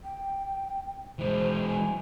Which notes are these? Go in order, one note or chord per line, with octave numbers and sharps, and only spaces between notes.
G5
E3 G#3 C5
G#5